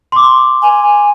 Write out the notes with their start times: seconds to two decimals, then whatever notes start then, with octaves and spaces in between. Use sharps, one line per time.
0.12 C6 D6
0.62 G#5